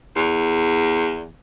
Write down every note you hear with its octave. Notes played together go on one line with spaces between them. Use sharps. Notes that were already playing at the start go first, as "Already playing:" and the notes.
E2